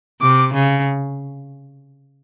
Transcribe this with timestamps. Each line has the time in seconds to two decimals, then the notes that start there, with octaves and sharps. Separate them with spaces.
0.21 C3 D6
0.54 C#3